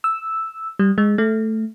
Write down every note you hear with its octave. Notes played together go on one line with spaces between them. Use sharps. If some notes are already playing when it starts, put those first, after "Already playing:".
E6
G3
G#3
A3